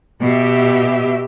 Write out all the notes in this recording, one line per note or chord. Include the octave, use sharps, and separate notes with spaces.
B2 G4 E5